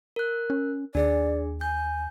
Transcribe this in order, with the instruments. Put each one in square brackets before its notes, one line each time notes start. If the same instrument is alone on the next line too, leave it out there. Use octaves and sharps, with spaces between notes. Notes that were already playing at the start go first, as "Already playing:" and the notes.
[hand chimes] A#4 F#6
[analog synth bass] C#4
[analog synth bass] D#2 [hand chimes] D4 G#4 [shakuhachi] D5
[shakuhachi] G#5 [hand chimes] G6